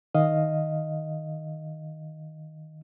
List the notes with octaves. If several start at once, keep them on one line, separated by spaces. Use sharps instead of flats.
D#3 D#5 F5